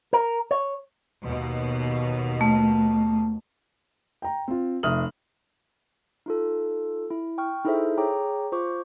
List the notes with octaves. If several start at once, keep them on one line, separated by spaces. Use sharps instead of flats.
A#4
C#5
D#2 B2
A3
G5 A#5
C4 F4
F1 E5 D#6 F6 F#7
D#4 F4 A4
E4
G5 C#6 F6
D#4 E4 G#4 A4 C5 E5
G#4 C#5 G5 A#5 D6
F4 C5 C#6 D6